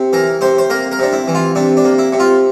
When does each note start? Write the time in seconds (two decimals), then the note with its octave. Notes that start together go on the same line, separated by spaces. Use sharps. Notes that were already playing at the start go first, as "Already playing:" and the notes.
Already playing: C3
0.13 E3 A#4
0.41 C3 C5
0.58 C5
0.70 A#3 A#4
0.92 A#4
0.99 C3 D4
1.13 E4
1.28 E3
1.35 F4
1.55 C3 D4
1.77 D4
1.84 A#3
1.98 E4
2.13 C3
2.20 F4